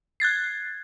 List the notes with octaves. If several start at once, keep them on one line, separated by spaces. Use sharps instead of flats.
F#6 G#6 A6 C7